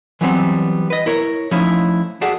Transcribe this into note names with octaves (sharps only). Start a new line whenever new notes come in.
E3 F#3 G3 B3 C4
B4 D#5
E4 A#4 C#5
F3 A3 C#4 D#4 E4
F#4 G#4 A4 D5 E5 F#5